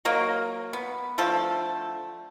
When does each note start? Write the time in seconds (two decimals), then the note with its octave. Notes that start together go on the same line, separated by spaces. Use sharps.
0.05 F#3 A#3 A#4 D#5
0.73 B3
1.18 D3 F3 A3 A4